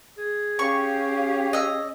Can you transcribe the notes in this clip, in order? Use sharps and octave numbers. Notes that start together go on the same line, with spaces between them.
G#4
C#4 G4 F5 C#6
D#5 E6